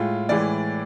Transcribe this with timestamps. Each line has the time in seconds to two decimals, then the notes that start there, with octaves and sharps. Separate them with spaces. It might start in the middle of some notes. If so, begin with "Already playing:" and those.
Already playing: A2 G#3 F4
0.29 A2 E3 G#3 D5